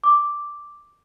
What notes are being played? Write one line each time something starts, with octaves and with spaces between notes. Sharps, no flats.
D6